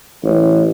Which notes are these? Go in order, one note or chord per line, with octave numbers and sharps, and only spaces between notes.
A1